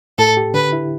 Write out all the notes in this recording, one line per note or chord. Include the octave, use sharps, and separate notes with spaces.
A2 A4
G4
D3 B4
E4